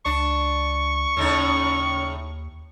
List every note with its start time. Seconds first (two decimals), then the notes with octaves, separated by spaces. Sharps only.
0.05 C#2 D4 C#6
1.17 D#2 A2 C#3 D#4